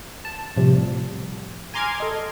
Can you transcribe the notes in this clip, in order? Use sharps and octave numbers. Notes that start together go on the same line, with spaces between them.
A5
A2 C3 F3 G3
G#5 A#5 C6 D6 F6 G#6
A4 D#5